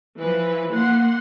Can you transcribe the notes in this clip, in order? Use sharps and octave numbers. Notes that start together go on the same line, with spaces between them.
E3 F3 B4
A#3 F#5 C6